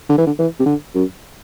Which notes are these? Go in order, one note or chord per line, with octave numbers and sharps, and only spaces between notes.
D3
E3
D3
E3
C3
D3
F#2